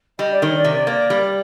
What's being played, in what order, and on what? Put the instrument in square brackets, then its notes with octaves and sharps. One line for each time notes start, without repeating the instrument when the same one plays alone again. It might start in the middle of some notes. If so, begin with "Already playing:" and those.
[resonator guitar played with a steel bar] G3 [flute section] D#5
[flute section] D5
[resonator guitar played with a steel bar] D#3 [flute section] C#5
[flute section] D5
[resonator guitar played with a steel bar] C3
A#3
G3